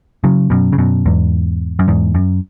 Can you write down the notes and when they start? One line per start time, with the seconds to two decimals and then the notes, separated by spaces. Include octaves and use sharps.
0.24 C#3 F#3
0.50 F#2 B2
0.73 C#3
0.78 F#2 B2
1.06 E2 G#2
1.79 F#2
1.88 E2 G#2
2.15 F#2